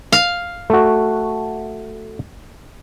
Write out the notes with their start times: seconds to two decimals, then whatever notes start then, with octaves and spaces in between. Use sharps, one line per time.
0.12 F5
0.70 A3 F#4